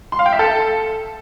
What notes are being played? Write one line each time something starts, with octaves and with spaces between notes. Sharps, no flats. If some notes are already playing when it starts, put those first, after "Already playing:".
C6
F5
G5
E5
A4